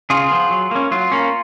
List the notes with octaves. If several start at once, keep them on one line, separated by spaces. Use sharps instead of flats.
C#3 F4 G#4
F3 B3
F#3
A#3 C#4
F#3 F4
A#3 C#4